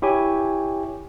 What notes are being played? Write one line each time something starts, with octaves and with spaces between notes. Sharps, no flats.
E4 G4 C#5 G#5